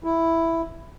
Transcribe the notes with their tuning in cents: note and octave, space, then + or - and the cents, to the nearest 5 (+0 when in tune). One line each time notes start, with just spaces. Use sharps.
E4 +0